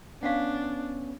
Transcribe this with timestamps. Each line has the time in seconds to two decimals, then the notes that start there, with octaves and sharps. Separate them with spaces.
0.23 B3 C#4 D4 C#5 F5 F#5